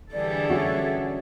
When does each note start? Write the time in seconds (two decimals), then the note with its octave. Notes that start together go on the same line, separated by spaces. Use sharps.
0.13 D3 E3 G3 D4 G#4 A4 D5
0.49 C#4 F#4 E5